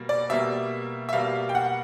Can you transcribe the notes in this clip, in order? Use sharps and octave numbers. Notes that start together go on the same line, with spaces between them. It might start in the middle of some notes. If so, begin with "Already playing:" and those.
Already playing: B2 G3 A#3
D5
B2 G3 A#3 E5
E5
B2 G3 A#3 F5
G5
F#5